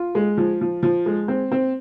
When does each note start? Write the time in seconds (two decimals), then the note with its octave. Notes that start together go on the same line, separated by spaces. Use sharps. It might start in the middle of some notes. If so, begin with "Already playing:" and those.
Already playing: F4
0.15 G#3
0.37 F3
0.61 F3
0.83 F3
1.06 G#3
1.28 C4
1.52 C4